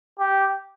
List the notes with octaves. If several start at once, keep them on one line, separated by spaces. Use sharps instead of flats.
G4